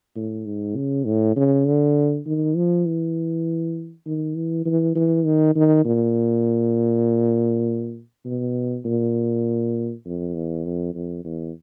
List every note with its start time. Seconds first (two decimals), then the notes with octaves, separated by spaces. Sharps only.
0.16 A2
0.46 G#2
0.76 C#3
1.06 A2
1.36 C#3
1.66 D3
2.26 D#3
2.56 F3
2.86 E3
4.06 D#3
4.35 E3
4.66 E3
4.96 E3
5.26 D#3
5.55 D#3
5.85 A#2
8.25 B2
8.85 A#2
10.05 F2
10.35 E2
10.65 F2
10.94 F2
11.25 E2